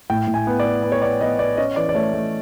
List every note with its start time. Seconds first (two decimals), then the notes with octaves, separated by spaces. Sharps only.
0.10 A2 G5
0.27 A2
0.34 G#5
0.47 B3
0.59 D5
0.66 B3
0.83 B3
0.92 C#5
1.02 B3 D5
1.21 B3 D#5
1.39 B3 D5
1.57 C#4 D#5
1.76 E3 D5
1.89 D5
1.95 A3 C#5
2.13 A3